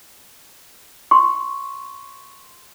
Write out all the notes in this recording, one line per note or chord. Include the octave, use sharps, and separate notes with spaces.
C6 C#6